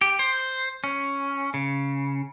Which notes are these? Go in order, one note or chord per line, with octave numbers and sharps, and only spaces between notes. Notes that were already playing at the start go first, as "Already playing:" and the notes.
G4
C5
C#4
C#3